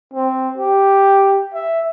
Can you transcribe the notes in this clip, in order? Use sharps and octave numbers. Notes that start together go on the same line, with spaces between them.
C4
G4
E5